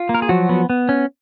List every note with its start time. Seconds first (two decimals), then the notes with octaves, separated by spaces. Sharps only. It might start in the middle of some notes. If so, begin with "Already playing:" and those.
Already playing: F4
0.09 A#3
0.15 A#4
0.22 G#4
0.29 F3 F#3 F#4
0.49 B3
0.70 B3
0.89 C#4